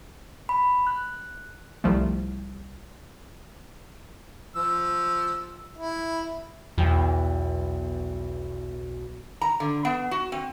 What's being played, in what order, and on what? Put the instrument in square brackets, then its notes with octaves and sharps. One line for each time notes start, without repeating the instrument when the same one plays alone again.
[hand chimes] B5
F#6
[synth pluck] C2 F3 A3
[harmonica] F3 E6
E4
[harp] B1 G5 [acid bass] E2
[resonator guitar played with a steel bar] A#5
D3
B3
F#4
C4